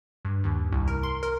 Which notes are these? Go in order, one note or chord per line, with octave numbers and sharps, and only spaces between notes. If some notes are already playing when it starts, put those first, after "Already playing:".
G2
D#2
C2
A#4
C6
A#4